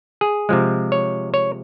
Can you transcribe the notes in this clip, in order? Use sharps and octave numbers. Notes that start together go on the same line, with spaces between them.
G#4
C3 F3 G#3
C#5
C#5